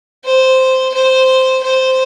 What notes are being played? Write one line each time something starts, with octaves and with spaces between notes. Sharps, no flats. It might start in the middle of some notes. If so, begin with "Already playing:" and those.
C5
C5
C5